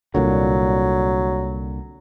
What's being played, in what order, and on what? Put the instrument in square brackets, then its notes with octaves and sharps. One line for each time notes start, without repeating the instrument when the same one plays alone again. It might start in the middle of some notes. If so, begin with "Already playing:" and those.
[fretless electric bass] C2 A#2 D3 [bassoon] F#3